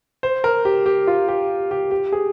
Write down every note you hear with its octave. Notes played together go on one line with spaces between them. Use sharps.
C5
A#4
G4
G4
F4
G4
G4
G4
G#4